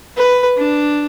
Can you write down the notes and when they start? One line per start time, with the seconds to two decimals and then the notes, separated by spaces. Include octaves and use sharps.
0.17 B4
0.57 D4